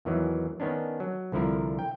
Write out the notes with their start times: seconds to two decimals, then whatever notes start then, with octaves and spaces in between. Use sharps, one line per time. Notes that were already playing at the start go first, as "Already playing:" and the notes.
0.05 E2 D#3 E3 F#3
0.60 D#3 B3 C#4 D4
1.00 F#3
1.32 C2 D3 F3 E4 A#4
1.79 G5